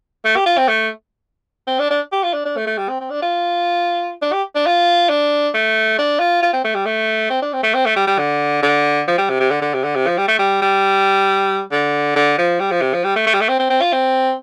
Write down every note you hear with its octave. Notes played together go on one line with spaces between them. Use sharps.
A3
G4
F4
C4
A3
C4
D4
D4
G4
F4
D4
D4
A3
A3
G3
C4
C4
D4
F4
D4
G4
D4
F4
D4
A3
D4
F4
F4
C4
A3
G3
A3
C4
D4
C4
A3
C4
A3
G3
G3
D3
D3
F3
G3
C3
C3
D3
D3
C3
D3
C3
F3
G3
A3
G3
G3
D3
D3
F3
G3
F3
C3
F3
G3
A3
A3
G3
A3
C4
C4
C4
F4
C4